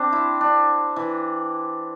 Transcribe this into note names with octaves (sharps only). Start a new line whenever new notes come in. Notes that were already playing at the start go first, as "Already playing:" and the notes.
Already playing: C4 D4
E4
D4
E3